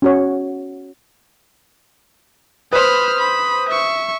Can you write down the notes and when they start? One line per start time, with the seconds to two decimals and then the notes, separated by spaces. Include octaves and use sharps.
0.02 C#4 F#4 C#5
2.73 B4 C5 B5 D#6 F6
3.19 B5
3.69 E5 C#6